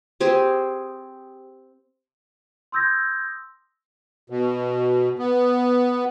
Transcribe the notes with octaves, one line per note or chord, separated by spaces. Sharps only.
C4 G4 G#4 C5
C6 D#6 E6 G6 G#6 A#6
B2
B3